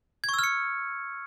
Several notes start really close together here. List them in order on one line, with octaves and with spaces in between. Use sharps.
G#6 C#6 E6 F6 C#7